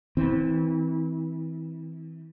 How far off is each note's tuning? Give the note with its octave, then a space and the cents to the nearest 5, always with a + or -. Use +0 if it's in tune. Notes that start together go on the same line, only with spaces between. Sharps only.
E3 -30 C4 -10